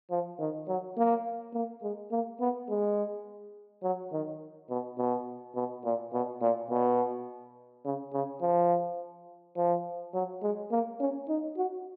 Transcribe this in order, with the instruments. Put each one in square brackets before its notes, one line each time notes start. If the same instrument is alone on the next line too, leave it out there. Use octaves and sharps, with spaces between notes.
[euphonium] F3
D#3
F#3
A#3
A#3
G#3
A#3
B3
G#3
F#3
D#3
B2
B2
B2
A#2
B2
A#2
B2
C#3
C#3
F3
F3
F#3
G#3
A#3
C#4
D#4
F#4